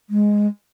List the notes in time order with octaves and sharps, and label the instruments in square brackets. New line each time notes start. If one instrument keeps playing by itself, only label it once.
[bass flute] G#3